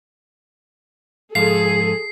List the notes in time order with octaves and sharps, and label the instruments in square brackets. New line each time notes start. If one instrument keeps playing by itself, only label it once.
[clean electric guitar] G#2 F3 F5 [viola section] G#4 A4 [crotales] C7